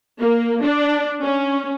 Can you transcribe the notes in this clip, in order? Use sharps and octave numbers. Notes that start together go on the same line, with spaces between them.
A#3
D4
C#4